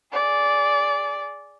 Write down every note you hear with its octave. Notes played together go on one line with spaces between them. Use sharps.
G#4 D5